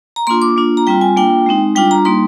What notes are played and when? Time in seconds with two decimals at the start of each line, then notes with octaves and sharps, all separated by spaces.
0.16 A#5
0.27 A#3 D4 F4 C6
0.42 D6
0.57 A#3 D4 F4
0.77 A#5
0.87 G3 C4 F4 G5
1.01 G#5
1.17 A#3 D4 F4 G5
1.46 G#3 C4 D#4
1.75 G3 D4 F4 G5
1.91 A#5
2.05 G3 A#3 D#4 C6